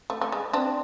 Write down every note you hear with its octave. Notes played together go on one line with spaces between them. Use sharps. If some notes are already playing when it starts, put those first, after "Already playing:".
A3
A3
G#3
C4 D4